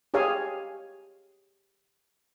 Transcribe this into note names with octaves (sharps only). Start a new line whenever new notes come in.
G4 G#4 C#5 F5 G#5